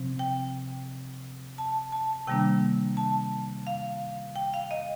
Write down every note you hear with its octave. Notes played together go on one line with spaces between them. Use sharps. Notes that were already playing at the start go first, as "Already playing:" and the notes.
Already playing: C3 F3 C4
G5
A5
A5
C3 D#3 G3 A#3 D4 G5
A5
F5
G5
F5
D#5